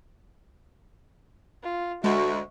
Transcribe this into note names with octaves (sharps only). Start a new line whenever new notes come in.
F4
D2 G#3 F#4 E5 C#6